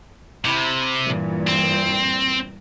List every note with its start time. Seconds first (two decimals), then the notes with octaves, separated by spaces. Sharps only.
0.45 C3 E4
1.05 G2 A#2 E3
1.47 C4